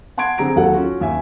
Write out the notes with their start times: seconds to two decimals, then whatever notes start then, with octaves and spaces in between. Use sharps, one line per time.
0.18 F#5 A5 C6 G#6 D7
0.38 D3 C4 G#4 A#5 D7
0.56 D#2 F#3 A4 F#5
0.74 C#4 F4 F#4
1.01 D#2 E5 G#5